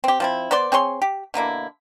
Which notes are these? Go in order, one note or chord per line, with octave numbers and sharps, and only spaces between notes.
C4 G4
F3 C4 E4
B3 C5 D5 C6
C4 G#4 C#5 C6
G4
B2 D3 A#3 E4